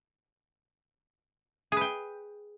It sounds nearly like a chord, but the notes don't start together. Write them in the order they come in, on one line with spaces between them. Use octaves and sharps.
G#4 B4 G5